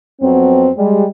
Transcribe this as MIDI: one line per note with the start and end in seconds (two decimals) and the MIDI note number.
0.21 0.70 41
0.21 0.70 54
0.21 0.70 59
0.21 0.70 60
0.76 1.04 55
0.76 1.04 56